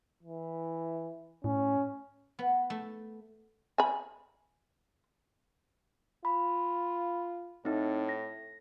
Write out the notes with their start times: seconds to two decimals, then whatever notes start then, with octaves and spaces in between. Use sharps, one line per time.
0.23 E3
1.44 A2 C#4
2.39 B3
2.70 A3
3.78 G#5 B5
6.25 F4 B5
7.65 A2 C4 D#4
8.09 A#6